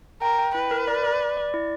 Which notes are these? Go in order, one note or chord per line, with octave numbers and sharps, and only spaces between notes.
A#4 G5
G5
E4 B4
A#4
D5
D5
D5
D5
E4